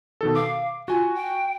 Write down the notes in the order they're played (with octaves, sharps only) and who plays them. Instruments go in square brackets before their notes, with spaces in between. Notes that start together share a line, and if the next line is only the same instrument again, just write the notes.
[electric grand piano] B2 D#3 A4
[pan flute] F5 [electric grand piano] D6
[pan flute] F4 [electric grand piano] F#4 G#5
[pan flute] G5